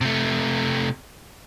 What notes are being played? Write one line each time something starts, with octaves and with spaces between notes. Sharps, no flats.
C3 A3